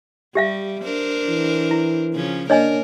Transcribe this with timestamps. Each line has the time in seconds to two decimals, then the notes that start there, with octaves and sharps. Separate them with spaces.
0.35 G3 G4 E5 F5
0.83 D4 A#4 C5
1.28 E3
1.71 E4
2.13 C#3 F3 C#4
2.50 A#3 D4 A#4 C#5 D#5 G#5